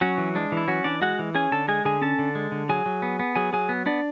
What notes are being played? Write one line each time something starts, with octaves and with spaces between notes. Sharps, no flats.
F#3 C#4 F#4
E3
G#3 D4
E3
E4
F#3 C#4 F#4
E3 D4 D5
G#3 F#4 F#5
E3
C#4 G#4 G#5
D3 A4 A5
G#3 G#4 G#5
D3 G#4 G#5
C#4 A4 A5
D3
G#3
D3
F#3 G#4 G#5
F#3
B3
B3
F#3 G#4 G#5
F#3 G#4 G#5
B3
B3 D4 D5